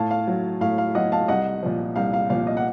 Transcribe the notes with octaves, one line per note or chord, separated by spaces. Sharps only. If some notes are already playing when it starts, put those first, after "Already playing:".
Already playing: A2 F5 A5
F5
F#3
A2 F5
F5
F#3 D#5 F#5
F5 A5
C2 D#5 F#5
A#2 F3
C2 F5
F5
A#2 F3 F5
D#5
F#5